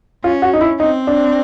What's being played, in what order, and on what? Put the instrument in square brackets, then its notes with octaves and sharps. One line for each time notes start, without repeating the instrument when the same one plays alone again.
[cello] C#4 [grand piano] F4
[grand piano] F#4
D#4
E4
[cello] C4 [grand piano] D#4
[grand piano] D4